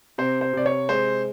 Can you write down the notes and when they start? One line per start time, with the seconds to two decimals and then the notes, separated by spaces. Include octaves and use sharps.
0.18 C3 C5
0.41 C5
0.53 C3 D5
0.66 C#5
0.89 G#3 C5